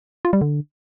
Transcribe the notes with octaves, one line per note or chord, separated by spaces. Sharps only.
F4
G3
D3